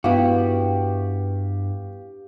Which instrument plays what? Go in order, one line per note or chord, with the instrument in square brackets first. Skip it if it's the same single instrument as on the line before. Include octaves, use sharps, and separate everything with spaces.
[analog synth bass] G2 [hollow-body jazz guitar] B3 E4 F#4 [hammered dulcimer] G4 [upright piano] F5